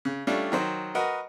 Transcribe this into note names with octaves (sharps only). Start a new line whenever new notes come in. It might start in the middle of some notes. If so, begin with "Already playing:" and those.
C#3
G3 A3 C#4 D4 F4
D#3 F#3 C5
F#4 A#4 B4 D#5 F#5